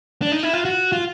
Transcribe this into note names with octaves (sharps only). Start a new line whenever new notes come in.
D4
D#4
E4
F4
F#4
F4